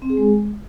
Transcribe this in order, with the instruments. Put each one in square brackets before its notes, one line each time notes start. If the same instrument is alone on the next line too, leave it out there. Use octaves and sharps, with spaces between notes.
[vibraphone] C4
G#4
G#3